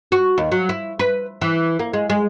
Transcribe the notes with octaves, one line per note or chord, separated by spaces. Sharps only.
F#4
D#2
F#3
E4
B4
E3
A#3
G#3
G#3